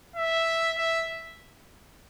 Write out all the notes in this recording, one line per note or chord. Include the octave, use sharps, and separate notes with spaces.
E5
E5